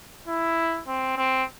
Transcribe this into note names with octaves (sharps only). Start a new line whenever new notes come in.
E4
C4
C4